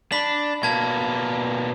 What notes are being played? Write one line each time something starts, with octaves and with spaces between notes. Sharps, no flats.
D4 B5 B6 F#7
B2 A#3 A5 G#6